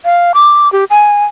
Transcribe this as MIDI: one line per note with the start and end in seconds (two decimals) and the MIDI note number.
0.05 0.32 77
0.34 0.70 86
0.72 0.84 67
0.90 1.24 80